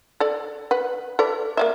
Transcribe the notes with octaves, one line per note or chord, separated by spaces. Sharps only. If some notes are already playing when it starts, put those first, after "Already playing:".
A4 D5
B4 F#5
A4 B4 D5
A#3 D5 E5